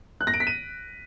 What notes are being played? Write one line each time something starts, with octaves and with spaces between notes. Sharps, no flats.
F#6
A#6
D7
B6
D#7